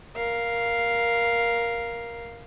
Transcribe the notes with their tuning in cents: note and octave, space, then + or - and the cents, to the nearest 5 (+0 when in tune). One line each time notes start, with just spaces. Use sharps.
A#4 +10 F5 +0